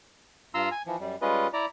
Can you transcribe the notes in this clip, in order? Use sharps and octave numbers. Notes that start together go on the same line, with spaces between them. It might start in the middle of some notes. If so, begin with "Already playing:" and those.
G2 F4 A#5 C6 E6
G#5
E3 F3
F#2 G3
G3 G#3 C#4 F4 B4 D#5
E4 D5 A#5